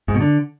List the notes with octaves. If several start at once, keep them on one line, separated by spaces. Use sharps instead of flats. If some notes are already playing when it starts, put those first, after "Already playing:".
G#2
B2
D3